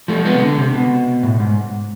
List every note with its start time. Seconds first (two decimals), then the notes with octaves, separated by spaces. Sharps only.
0.08 F3 A3
0.25 G#3 B3
0.34 C3
0.42 D3
0.58 C3
0.74 B2
1.23 A2
1.40 G#2